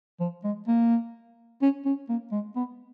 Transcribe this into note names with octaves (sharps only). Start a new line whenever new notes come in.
F3
G#3
A#3
C#4
C#4
A#3
G#3
B3